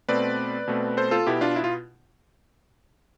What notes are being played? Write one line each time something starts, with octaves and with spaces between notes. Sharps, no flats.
B2 A3 C4 B4 D5
B2 A3 C4
A4 C5
F4 A4
B2 B3 E4 G4
D4 F4
E4
F4